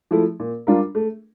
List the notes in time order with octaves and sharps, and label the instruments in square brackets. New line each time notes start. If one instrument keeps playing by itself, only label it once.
[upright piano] F3 A3 E4
A#2
G3 D4 F4 A#4
A3